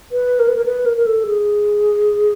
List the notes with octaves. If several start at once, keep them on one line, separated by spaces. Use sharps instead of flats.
B4
A#4
B4
A#4
B4
A#4
A#4
A4
G#4